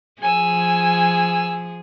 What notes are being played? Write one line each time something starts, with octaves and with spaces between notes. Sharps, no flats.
F3 G#4 G#5 E6